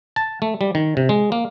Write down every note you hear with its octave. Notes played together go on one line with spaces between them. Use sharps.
A5
A3
G3
D#3
C3
G#3
A#3